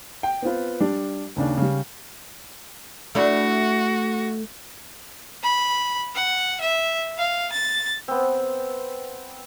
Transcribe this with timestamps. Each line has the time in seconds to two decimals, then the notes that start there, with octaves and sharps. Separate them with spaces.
0.23 G5
0.42 B3 C4 F4 B4
0.80 G3 D4
1.36 D#2 C#3 D4
1.58 C#3 G3
3.15 A3 D4 E4 F#4
5.43 B5
6.14 F#5
6.61 E5
7.17 F5
7.52 A6
8.08 B3 C4